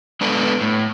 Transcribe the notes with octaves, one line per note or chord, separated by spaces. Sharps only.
G#3 B3 D4 A4 B4
A2